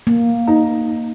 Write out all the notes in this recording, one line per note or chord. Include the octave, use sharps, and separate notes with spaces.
A#3
D#4